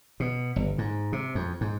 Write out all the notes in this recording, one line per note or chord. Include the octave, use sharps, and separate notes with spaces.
B2
G1
G#2
C3
F2
G#2